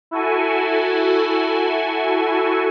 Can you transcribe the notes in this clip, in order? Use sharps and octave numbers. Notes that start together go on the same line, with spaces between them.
E4 F#4 A4 G#5